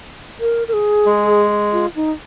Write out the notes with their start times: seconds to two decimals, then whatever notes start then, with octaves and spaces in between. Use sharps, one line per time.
0.40 A#4
0.68 A#4
0.73 G#4
1.06 G#3
1.72 F4
1.95 D#4